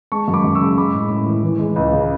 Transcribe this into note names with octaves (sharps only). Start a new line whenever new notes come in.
G#3 A5 C#6
F#2
B5 D6
F#2
C#6 E6
C#3
G#3 B5 D6
A2
A2
E3
E3
G#3
C#2
C#3